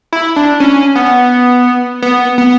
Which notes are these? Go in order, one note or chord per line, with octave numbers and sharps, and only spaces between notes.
E4
D4
C#4
B3
B3
B3